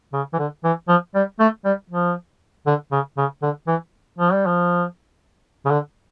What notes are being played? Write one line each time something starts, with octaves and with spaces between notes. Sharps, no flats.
C#3
E3
D3
E3
F3
G3
A3
G3
F3
D3
C#3
C#3
D3
E3
F3
G3
F3
C#3
D3